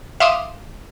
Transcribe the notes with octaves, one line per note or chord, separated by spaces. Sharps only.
E5 F5 C6 D6 D#6